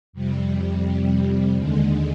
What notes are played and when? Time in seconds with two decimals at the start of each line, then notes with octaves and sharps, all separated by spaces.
0.13 F2 C3 G3
1.55 D#2 D3 G#3